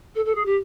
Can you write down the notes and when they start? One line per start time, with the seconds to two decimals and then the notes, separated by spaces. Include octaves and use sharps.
0.15 A4
0.25 A4
0.35 G#4
0.45 G4